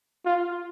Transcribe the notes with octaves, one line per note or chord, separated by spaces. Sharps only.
F4